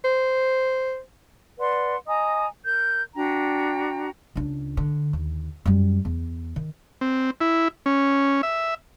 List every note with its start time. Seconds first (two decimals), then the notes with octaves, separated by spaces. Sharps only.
0.05 C5
1.59 B4 D5 F#5 C6
2.07 D#5 G#5 A#5 D#6
2.65 A#4 G6
3.15 D4 F#4 G5 A#5
4.36 C#2 D4
4.77 D3
5.13 D#2
5.65 F#2 G3
6.05 E2
6.56 D#3
7.01 C4
7.41 E4
7.86 C#4
8.43 E5